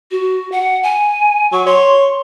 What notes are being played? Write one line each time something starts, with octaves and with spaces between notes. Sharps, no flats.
F#4
F#5
G#5
F#3 C#6
C#5 C6